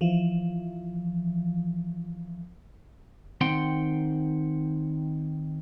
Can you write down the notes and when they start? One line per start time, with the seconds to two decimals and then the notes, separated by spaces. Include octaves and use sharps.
0.01 E3 F3
3.41 D#3 C4 F#5 G5 C6